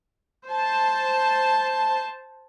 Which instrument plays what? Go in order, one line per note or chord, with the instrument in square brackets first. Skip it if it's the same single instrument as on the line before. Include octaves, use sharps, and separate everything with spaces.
[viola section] C5 A5